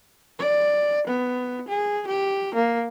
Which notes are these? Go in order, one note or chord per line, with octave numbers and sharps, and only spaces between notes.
D5
B3
G#4
G4
A#3